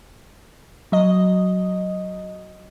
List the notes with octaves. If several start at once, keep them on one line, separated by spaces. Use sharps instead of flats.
F#3 D#5